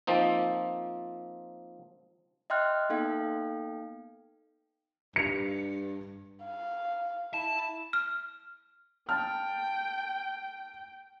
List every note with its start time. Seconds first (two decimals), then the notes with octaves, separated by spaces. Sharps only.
0.07 F3 A#3 C4 D#4
2.50 D#5 E5 G5 C6 F6 F#6
2.89 A#3 B3 D#4 A4 F5 G5
5.16 G2 C#7 F7
6.45 F5
7.34 E4 A5
7.93 F6
9.09 G5 A5 F6